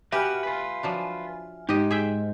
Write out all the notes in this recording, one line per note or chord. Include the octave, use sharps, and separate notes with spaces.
F#4 G4 B4 E5 G#5 F6
F4 B4
F3 F#3 D4
G#2 D#4 G4 D#5
G#4 E5 G5